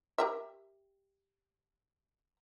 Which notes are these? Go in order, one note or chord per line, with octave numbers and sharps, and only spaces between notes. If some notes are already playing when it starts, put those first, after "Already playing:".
G4 A#4 E5